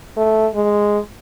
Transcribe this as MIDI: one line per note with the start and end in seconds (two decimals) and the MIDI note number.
0.17 0.48 57
0.55 0.99 56